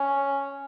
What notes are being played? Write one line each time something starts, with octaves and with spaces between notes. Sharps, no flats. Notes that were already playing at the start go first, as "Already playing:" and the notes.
Already playing: C#4